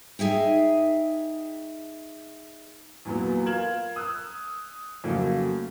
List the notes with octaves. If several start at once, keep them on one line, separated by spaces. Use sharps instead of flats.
D#4 G#4 E5 G5
E2 A#2 F#3 B3
F4 A#4 F6 G#6 E7 F#7
D#6 E6 F#6
F2 C#3 F#3 A3 A#3